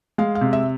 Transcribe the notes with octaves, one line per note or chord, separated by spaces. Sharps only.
G#3 F5
F5
C3
E5